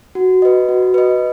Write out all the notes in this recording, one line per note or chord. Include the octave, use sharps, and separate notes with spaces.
F#4
B4 D#5
F#4
B4 D#5